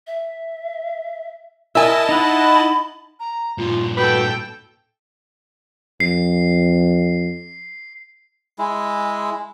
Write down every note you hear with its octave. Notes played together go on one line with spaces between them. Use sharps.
E5
E4 A#4 D#5 E5 G#5 A5
D#4 F#5 B5
A#5
G2 A#2 F4
F#4 A4 B4 G5
F2 C7
G#3 E4